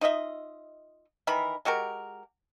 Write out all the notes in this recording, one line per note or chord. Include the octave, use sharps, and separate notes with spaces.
D#4 F4 D#5 E5
D#3 E3 A#4 B5
G#3 F#4 G4 A#4